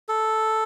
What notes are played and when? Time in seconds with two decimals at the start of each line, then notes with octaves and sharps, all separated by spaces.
0.09 A4